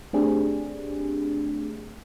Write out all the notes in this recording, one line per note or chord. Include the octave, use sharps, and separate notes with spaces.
A3 C4 D4 G4 G#4